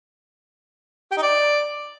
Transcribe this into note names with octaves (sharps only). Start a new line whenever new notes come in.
G4
D#4
D5